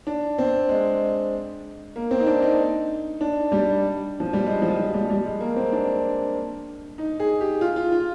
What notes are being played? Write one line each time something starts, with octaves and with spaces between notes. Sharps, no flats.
D4
C4
G#3
A#3
C4
D#4
D4
D#4
D4
G3
F3
G3
G#3
F3
F3
G3
G3
G#3
A#3
C4
D4
D#4
G#4
G4
F4
F4
F4